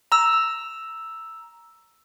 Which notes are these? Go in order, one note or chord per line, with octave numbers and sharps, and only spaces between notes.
A#5 E6